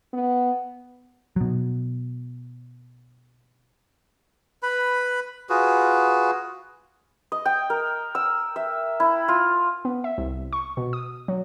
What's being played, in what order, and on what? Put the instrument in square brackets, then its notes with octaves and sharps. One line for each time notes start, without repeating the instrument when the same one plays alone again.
[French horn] B3
[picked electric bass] B2 F#3
[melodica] B4 B5
F4 F#4 G#4 B4
[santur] D#5
G5
A#4
E6
E5
E4
F4
[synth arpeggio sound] B3
E5
C2
C#6
B2
D#6
F#3